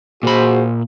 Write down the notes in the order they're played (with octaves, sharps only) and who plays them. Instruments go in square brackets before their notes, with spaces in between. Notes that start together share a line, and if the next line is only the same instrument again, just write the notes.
[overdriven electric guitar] A#2 B5 [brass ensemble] F#4 G#4 C5